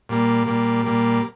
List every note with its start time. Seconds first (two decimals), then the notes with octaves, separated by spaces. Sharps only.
0.09 A#2 G3 A#3
0.47 A#2 G3 A#3
0.85 A#2 G3 A#3